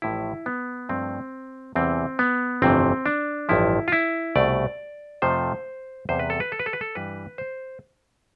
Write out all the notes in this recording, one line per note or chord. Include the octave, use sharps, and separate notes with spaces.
A1 A2 F3 E4
B3
G2 F3 A3 C4
E2 C3 E3 G3 C4
B3
G1 F2 C3 E3 A3 C4
D4
A1 G2 F3 E4
F4
E4
C2 B2 A3 D5
F2 C3 F3 A3 C5
E2 C3 G3 C5
B4
A4
B4
A4
B4
A4
B4
A4
G2 E3 G3 B4
C5